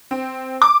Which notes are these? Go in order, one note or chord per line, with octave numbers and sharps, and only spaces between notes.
C4
D6